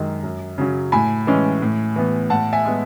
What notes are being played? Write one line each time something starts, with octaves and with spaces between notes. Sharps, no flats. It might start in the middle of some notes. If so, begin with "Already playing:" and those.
Already playing: F#2 D#3 G#3
F#2
C#3 F#3 C#4
A2 G#5 B5
E3 G#3 C#4
A2
E3 B3
A2 F#5 A5
E5 G#5
G#3 B3